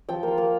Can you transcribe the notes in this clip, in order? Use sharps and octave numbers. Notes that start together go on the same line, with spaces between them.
F3 G5
A#3 F4
A#3